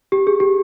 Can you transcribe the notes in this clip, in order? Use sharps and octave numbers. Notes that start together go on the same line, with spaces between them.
G4
G#4
G4